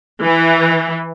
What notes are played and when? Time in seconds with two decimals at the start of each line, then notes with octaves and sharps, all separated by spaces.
0.22 E3